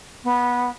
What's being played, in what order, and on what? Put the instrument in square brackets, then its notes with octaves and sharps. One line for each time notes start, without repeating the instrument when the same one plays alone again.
[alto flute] B3